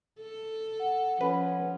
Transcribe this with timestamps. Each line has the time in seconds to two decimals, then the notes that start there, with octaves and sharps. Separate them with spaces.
0.20 A4
0.80 F#5
1.21 F3 C#4 B4